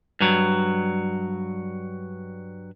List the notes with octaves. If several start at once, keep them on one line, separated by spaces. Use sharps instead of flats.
G2 F#3